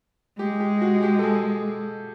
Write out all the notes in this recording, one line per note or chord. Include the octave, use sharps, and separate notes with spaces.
G#3 G4
G4
F#4
G4
A4
G#4